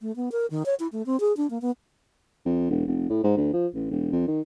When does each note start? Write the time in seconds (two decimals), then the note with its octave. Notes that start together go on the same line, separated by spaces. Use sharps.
0.01 A3
0.16 B3
0.32 A#4
0.50 D#3
0.66 C#5
0.80 E4
0.92 A3
1.06 C4
1.20 G#4
1.37 D4
1.50 A#3
1.62 B3
2.46 F2
2.70 E1
2.87 F1
3.10 A2
3.24 G#2
3.37 D2
3.53 F3
3.74 A1
3.91 E1
4.12 F2
4.28 D#3